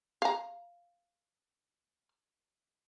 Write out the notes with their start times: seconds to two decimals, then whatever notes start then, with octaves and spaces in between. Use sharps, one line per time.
0.22 F5 A#5